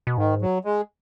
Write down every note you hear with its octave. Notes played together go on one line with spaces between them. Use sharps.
B2
G#2 D#3
F#3
G#3